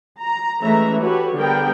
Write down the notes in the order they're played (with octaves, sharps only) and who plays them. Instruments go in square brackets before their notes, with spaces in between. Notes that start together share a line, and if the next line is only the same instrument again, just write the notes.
[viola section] A#5
E3 G#3 A3 C#4 E5 A#5
F#4 G4 A4 B4 C#5
D3 G3 B3 G#4 A#4 G5